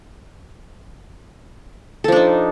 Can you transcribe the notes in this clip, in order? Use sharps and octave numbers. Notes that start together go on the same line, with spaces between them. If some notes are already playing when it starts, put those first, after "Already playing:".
F3 D4 D#4 A4